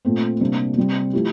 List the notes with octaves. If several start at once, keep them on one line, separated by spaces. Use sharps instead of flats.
A#2 A3 C4
C3 G3 A#3 D4
C3 G3 C4
F3 A3 E4 G4